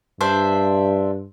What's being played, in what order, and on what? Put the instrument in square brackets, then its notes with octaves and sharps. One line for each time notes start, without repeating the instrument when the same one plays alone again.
[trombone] G2 [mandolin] D4 C5 E5